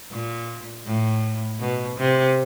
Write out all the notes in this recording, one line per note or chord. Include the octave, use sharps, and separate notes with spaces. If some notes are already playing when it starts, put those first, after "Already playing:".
A#2
A2
B2
C3